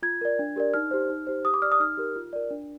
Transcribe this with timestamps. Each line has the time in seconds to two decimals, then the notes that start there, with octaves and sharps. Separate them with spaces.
0.03 F4 G#6
0.21 A#4 D5
0.39 D4
0.56 G4 A#4 D5
0.74 D#4 F6
0.91 G4 C5
1.09 D#4
1.27 G4 C5
1.45 G4 D#6
1.54 D6
1.62 D5 F6
1.72 D#6
1.80 D#4 F6
1.97 G4 A#4
2.16 F4
2.33 A#4 D5
2.50 D4